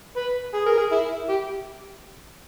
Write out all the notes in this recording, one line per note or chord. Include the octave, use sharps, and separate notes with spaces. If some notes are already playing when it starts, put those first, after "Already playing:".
B4
G#4
A#4
G#4
E4
G4